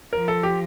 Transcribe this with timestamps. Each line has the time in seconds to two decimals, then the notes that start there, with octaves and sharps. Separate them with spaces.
0.12 F3 A#4
0.28 A4
0.43 G4